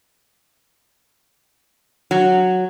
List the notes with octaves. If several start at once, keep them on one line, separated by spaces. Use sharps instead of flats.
F#3